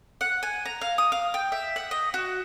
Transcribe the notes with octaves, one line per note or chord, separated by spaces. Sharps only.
F#5
G#5
A#5
F5
D#6
F5
G5
E5
F#5
D#5
F#4